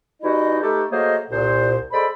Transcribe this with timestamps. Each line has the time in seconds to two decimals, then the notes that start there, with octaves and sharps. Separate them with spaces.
0.21 E3 G3 D#4 E4 F#4 D#5
0.62 A3 D#4 G4 A4 B4
0.91 F#3 A3 A#3 G#4 C5 D#5
1.31 C2 A#2 C5
1.92 G#3 A4 C5 D5 B5